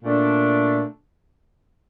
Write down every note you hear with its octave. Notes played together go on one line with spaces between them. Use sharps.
A#2 A3 D4